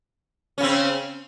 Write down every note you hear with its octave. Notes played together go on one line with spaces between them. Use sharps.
C#3 C4 C#4